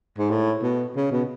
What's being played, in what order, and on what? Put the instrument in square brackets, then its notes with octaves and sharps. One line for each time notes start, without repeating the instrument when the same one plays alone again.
[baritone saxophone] G#2
A2
B2
C#3
B2